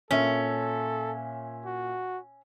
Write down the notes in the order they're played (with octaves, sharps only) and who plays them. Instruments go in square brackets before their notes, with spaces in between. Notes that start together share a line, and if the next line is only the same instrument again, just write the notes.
[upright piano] A#2 E5 [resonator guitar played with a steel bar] C#4 [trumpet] A4
[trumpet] F#4